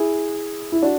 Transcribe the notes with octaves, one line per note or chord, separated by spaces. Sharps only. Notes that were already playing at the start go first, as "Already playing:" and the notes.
Already playing: E4 G#4
E4
D4 F#4